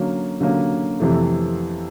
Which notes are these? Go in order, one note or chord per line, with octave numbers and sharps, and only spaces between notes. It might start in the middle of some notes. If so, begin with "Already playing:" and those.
Already playing: D3 F#3 A#3 C#4
D3 F#3 A#3 C#4
F2 C3 E3 A3